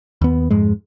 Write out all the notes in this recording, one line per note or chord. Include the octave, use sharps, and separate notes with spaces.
D#2 B3
F2 G#2 G#3